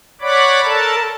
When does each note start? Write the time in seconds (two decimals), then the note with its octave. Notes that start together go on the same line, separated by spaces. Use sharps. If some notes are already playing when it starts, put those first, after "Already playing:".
0.21 C#5 D5 F#5 B5 D6
0.64 A4 A#4 A5